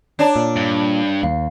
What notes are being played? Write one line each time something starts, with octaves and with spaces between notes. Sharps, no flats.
D4 C#5 D5 A5 A#5
A#2
G2
D#2 F5